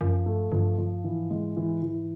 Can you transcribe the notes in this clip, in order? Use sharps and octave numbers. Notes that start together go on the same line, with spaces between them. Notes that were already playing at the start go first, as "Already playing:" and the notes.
F#2 F3
G2 A3
G2 F3
F3
G#2 E3
G#3
E3
E3